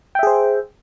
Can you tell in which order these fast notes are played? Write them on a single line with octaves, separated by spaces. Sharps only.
G5 E5 G#4 C5